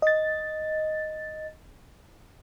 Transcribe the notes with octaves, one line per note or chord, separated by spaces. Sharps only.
D#5 A6